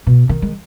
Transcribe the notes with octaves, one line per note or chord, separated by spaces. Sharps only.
B2
D#3
G#3